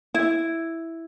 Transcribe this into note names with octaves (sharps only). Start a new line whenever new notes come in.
E4